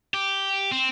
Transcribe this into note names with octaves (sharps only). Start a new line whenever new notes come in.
G4
C4